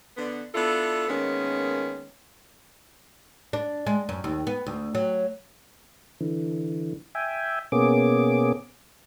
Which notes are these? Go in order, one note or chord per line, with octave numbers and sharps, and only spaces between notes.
D3 B3
B3 D4 E4 F4 A4
D#3 G#3 A#3 B3 C#4
D4
G#3
F#2
D#2
B3
D2
F#3
D3 E3
E5 G5 G#5
B2 A#3 B3 C#4 G#4 D6